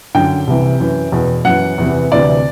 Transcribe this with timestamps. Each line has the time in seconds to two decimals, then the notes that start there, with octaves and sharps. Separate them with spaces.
0.15 F#2 D3 G5
0.47 C2 C3 E3
0.80 F#2 E3
1.12 E2 B2
1.45 F#2 E3 F#5
1.78 E2 C3 E3
2.11 D2 C3 E3 D5